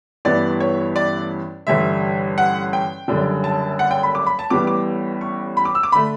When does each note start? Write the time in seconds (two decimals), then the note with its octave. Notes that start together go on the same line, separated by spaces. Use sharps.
0.25 A1 G2 E3 B3 E4 D5
0.60 C#5
0.96 D5
1.67 A1 G2 D3 E5
2.38 F#5
2.73 G5
3.08 F#1 F#2 D3 G3 D4
3.44 A5
3.79 F#5
3.91 G5
4.03 B5
4.15 D6
4.26 B5
4.39 A5
4.50 A1 A2 G3 B3 D6
4.67 D6
5.21 C#6
5.57 B5
5.65 D6
5.75 E6
5.83 D6
5.92 D3 A3 B5